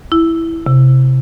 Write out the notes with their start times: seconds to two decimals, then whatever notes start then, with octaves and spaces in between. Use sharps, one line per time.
0.12 E4
0.66 C3